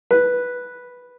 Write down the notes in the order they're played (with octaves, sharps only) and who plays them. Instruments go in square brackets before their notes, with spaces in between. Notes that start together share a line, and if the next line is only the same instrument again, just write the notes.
[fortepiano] B4